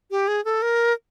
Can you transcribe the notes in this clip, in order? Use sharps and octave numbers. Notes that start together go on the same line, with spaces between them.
G4
G#4
A4
A#4